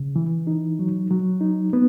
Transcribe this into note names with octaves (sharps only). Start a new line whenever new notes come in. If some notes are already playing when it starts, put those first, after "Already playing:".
Already playing: C#3
E3
D#4
F#3
F#3
D#4
B3